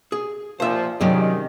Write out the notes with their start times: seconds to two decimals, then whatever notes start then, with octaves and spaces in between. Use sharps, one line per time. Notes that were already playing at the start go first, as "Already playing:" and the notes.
0.12 G#4
0.60 A#2 F3 C5 E5
1.01 C3 D#3 F#3 G#3 C#4 D5